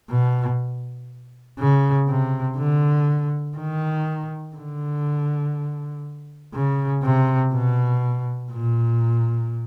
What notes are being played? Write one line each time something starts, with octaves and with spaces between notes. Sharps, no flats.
B2
C#3
C3
D3
D#3
D3
C#3
C3
B2
A#2